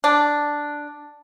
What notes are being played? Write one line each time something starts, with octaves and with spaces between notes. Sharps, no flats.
D4